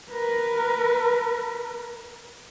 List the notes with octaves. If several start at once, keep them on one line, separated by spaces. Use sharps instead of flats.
A#4 B4